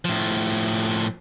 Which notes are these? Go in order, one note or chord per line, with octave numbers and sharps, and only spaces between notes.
A2 F3